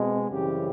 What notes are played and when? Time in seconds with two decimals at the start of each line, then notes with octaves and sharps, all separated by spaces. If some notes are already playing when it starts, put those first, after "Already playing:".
Already playing: B2 G#3 C4
0.29 F#2 C#3 E3 G3 C4 G4